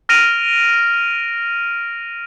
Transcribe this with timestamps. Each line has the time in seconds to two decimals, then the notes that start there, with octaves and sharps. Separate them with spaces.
0.09 F6 A#6 D7 D#7 F7